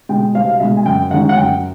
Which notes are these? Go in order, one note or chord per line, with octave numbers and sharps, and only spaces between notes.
B2 G#3 G5
C2 F5
F5
B2 G#3 E5
G#5
F#2 G5
D#3 G#3 C#4 F#5
F#5
F#2 G5